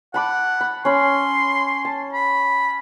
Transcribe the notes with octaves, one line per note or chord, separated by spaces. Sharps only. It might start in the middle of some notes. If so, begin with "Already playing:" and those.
F#5 A5 B5 D6
B5
C#4 B5 C6
A5
B5